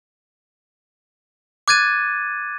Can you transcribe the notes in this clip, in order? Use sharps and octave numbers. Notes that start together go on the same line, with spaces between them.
D6 F#6 G#6 A6 D#7